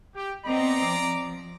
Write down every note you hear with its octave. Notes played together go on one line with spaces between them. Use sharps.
G4
B3 C4 D5 D#5 A#5 D6
F3